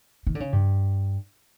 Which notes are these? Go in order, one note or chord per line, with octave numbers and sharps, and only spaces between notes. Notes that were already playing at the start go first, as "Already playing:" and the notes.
D#3
D3
C#3
G2